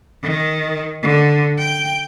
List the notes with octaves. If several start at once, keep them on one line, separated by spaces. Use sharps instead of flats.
D#3
D3
G5